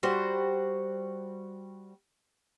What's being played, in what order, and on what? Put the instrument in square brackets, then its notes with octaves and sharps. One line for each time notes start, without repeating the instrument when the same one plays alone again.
[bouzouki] G3 F#4 C5